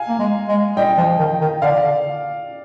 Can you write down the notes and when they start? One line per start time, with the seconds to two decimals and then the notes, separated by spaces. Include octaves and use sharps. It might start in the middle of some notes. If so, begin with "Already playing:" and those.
Already playing: F5 G#5
0.09 A#3
0.19 G#3
0.48 G#3
0.76 G3 D#5 G5
0.98 F3
1.19 D#3
1.41 D#3
1.62 D3 D5 F5
1.84 D3